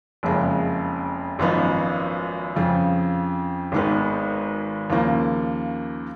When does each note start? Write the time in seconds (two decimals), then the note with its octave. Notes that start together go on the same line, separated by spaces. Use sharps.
0.23 F#1 F2 C#3 G#3
1.39 G#1 F#2 F3 B3 D#4
2.56 F2 C#3 F3
3.72 G#1 G#2 D#3 G#3 B3
4.90 D#2 C#3 F3 A#3